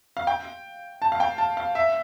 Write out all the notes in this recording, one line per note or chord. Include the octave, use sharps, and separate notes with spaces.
F5
G5
A5
F5
G5
A5
F5
E5